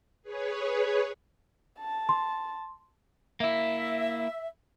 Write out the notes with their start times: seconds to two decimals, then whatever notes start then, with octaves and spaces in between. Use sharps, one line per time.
0.22 G#4 B4 C#5
1.79 A5
2.09 C6
3.40 A#3 E4 E5